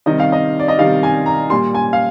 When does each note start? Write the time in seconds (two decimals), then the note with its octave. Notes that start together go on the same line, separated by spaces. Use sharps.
0.06 C3 D#3 G3 D#5
0.20 F5
0.32 D#5
0.60 D5
0.68 D#5
0.78 C3 D#3 G3 F5
1.03 G#5
1.26 A#5
1.50 A#2 G3 C6
1.75 G#5
1.93 F5